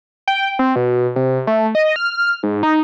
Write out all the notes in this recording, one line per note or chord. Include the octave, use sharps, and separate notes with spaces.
G5
C4
B2
C3
A3
D#5
F6
G#2
D#4